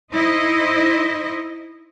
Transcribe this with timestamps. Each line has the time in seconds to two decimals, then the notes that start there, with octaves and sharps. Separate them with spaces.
0.12 D#4 E4 C5 D#5